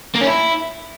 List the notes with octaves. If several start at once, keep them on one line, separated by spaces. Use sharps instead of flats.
A#3
C#4
E4